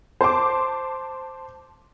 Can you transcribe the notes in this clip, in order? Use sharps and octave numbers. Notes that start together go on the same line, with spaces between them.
C5 A5 C6 D6